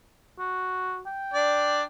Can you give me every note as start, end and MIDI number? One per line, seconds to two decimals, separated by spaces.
0.39 1.00 66
1.06 1.87 79
1.34 1.83 62
1.34 1.83 74